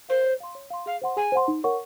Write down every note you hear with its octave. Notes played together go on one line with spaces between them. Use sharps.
A#4 C5 F5
C#5
F5 C6
C#5
F5 C6
G#4 F5
C5 F#5 C6
G#4 G#5
C5 F#5 C6
D#4
A#4 C#5 F#5 C#6